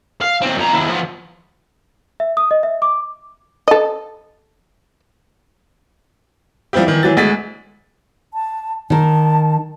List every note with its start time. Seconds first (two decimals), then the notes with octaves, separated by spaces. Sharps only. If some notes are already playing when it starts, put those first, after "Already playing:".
0.21 F5
0.42 D#2 C4
0.58 F2 A#5
0.73 D#2 E4
0.89 F3 B3
2.20 E5
2.37 D#6
2.51 D#5
2.63 E5
2.82 D6
3.68 A4 D#5
6.73 F3 G3 C4 E4 G4
6.87 D#3 E3
7.03 E3 F#3 A6
7.17 D2 G#3 A6 B6
8.34 A5
8.90 D#3 A#4 A5